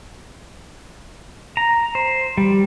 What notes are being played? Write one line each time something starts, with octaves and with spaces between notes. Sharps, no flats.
A#5
C5
G3